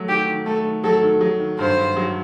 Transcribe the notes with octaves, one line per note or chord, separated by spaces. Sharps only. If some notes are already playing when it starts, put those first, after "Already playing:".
Already playing: F#3 A3
D#3 G4
D#3
A3 A4
D#3
F#3 A4
D#3
F#3
D#3
G2 C5
G2
F#3